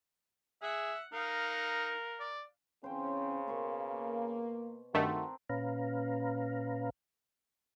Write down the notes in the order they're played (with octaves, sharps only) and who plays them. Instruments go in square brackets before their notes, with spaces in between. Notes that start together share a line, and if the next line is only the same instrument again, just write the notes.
[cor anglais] G#4 [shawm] E5 [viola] F#5
[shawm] D#4 [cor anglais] A#4 [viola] F5 F#5
[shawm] D5
[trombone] C#3 [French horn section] E3 C4 C#4 [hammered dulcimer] C5 G5
[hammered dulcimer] B2 C6 C#6 [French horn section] A#3
[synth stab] G2 D#3 A3 [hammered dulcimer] C4 D4 A#4 [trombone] F#4
[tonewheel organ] A#2 C#4 B4 F5 A#5